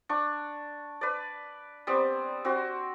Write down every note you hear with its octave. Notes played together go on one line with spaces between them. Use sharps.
D4 C#6
B4 D5
G3 B3 C4
C4 F#4